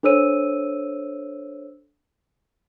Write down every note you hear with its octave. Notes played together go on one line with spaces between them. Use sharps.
D4 A4 C5 C#5 E6 D#7